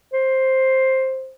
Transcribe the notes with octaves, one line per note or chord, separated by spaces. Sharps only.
C5